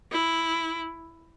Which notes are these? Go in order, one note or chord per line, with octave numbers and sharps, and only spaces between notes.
E4